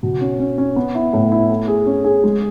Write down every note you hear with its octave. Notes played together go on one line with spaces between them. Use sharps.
B2
C#4
C#4
C#4
B3
E4
A2
E4
A3
G#4
C#4
G#4
G#3